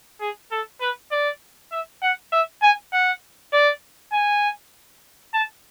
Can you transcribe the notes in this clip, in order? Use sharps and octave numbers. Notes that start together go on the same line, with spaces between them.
G#4
A4
B4
D5
E5
F#5
E5
G#5
F#5
D5
G#5
A5